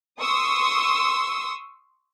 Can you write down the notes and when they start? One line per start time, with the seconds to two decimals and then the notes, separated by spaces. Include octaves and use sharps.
0.20 C6 C#6 D#6 E6